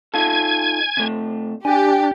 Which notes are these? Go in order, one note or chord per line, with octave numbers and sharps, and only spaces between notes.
D#4 F4 A4 G#5 G#6
C3 A3
D4 G4 G#5